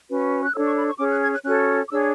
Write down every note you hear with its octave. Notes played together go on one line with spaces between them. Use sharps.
C#4 F#4 B4
F#6
D4 A4 C#5 E6
C#6
B5
C#6
C#4 G#4 C#5 D6
F#6
G#6
F#6
C#4 F#4 A4 C#5 F#6
D6
D4 G#4 C#5 E6